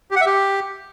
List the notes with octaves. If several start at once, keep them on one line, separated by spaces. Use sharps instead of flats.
G4
F#5
E5
G4